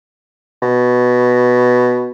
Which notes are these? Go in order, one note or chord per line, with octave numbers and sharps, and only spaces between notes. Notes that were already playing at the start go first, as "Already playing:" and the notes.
B2